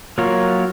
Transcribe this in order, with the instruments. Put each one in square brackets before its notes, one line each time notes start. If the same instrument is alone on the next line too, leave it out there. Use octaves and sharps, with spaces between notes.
[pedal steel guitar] F#3 A#3 F4 A#4 C#5